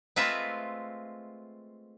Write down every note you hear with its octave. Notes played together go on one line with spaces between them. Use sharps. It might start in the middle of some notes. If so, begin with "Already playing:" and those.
G#3 A3 C4 F4 B4 E5